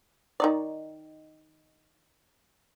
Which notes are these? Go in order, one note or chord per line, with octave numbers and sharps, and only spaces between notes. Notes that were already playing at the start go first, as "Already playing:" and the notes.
D#3 D#4 D5